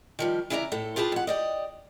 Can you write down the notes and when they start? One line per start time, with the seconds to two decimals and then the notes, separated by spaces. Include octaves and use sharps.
0.19 D#3 F3 G3
0.50 C#3 E3 E4 D5 D#5 A#5
0.72 A2 A4
0.96 F4 G4 G#4 B4 A5
1.12 F2 F#5
1.27 G4 D5 D#5